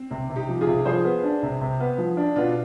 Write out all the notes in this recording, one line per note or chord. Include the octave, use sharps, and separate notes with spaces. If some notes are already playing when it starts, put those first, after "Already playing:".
Already playing: C4
C3 C4
C3
D#4 G4
F3
F4 G#4
C3
F3 G#4 C5
B3
D4
C3
C3
B3
F3
D4
B2 D4 F4